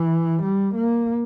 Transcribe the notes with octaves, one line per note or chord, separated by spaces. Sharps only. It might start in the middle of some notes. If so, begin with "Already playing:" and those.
Already playing: E3
G3
A#3